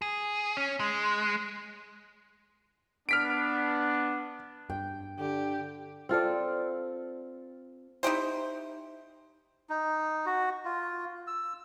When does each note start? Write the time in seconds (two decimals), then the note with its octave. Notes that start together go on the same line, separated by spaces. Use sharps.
0.02 G#4
0.57 C#4
0.80 G#3
3.09 B3 D4 F6 B6 D7
4.70 G2 G5
5.19 D3 G4
6.09 C4 F4 A4 D5
8.03 D#4 E4 G4 C5
9.70 D#4
10.26 F#4
10.65 F4
11.27 E6